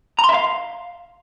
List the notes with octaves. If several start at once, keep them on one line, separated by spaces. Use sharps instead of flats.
A#5
C6
E5
F5